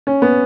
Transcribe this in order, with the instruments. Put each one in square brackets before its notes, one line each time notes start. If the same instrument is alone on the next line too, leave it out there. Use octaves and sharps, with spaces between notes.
[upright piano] C#4
B3